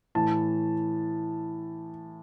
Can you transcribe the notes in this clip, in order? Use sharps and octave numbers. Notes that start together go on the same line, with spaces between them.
A2 E3 A5